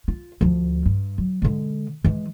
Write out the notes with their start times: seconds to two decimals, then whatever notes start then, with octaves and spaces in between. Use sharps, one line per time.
0.08 F4
0.41 D2 F3
0.86 G2
1.18 F#3
1.42 D3 G#3
2.04 E3 G#3